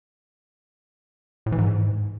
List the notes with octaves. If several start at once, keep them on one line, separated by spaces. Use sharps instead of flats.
A2
E3
G#2